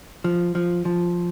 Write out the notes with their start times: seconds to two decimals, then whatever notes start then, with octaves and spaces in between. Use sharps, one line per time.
0.24 F3
0.55 F3
0.85 F3